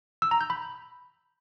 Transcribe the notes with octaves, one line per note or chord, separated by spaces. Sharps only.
E6
A#5
G6
B5